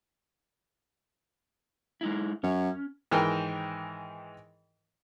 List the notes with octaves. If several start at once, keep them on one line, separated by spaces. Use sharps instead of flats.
G#3 D#4 E4
F#2 C#4
G#2 D#3 E3 A#4 G5